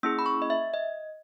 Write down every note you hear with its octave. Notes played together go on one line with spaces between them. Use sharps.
A#3 C#4 E4 G#4 E6
B5
C#6
D#5
E5
D#5